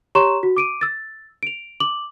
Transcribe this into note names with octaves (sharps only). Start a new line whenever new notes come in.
G4 C#5 A#5 C6 C#6 E7
F#4
D6 D7 D#7
E6 A6
D7 F7
D6 F#7